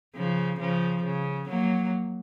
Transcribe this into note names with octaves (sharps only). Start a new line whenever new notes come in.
C#3 F3
C#3 F3
C#3
F#3 A#3